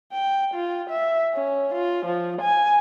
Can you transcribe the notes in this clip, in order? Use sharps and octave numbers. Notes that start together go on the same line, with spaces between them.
G5
F4
E5
C#4
F4
F3
G#5